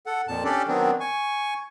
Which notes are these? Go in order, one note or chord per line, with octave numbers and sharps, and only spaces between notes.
A4 F#5
F2 A#2 A5
C#4 D4 G4 A4 D5
D#3 F#3 B3 C4 D4
G#5 C#6